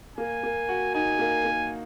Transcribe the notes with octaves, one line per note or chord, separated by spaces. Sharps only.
A#3 G#5
A#3
F#4
D#4 G#5
A#3
A#3